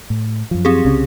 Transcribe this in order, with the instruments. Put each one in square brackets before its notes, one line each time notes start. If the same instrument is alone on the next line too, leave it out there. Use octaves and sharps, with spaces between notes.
[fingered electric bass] A2
F#2 F3
[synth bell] C4 G4 G#4
[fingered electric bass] C2 C#3 C#4